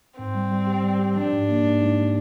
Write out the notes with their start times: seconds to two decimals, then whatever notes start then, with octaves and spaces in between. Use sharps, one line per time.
0.19 G#2 C4
0.35 G3
0.51 G3
0.67 G4
0.84 G3
0.99 G4
1.16 F3 D4
1.32 G#2
1.49 A#3
1.64 G#2
1.81 G#2